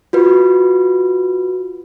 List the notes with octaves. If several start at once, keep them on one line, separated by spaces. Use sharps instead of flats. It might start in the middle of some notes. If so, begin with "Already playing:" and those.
F4 F#4 B4